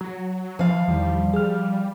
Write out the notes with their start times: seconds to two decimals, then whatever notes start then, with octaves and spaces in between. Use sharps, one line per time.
0.01 F#3
0.59 E3 F3 F5
0.88 E2 D#3 E3 G3
1.33 G#4 F6